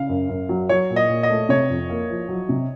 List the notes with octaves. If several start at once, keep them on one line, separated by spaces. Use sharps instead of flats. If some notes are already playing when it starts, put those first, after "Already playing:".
Already playing: C#3 F5
F#2
F#2
F#3
F#3 C#5
A#2
D#5
A#2
D#5
A3
C3 C#5
F2
A#3
F3
F#3
C3